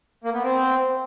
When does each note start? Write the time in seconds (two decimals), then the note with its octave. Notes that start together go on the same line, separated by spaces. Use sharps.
0.24 A#3
0.34 B3
0.43 C4